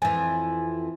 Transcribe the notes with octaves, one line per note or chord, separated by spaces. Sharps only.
F2 E3 G#5